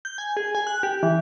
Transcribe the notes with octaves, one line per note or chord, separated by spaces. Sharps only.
G6
G#5
G#4
G#5
F#6
G4
E3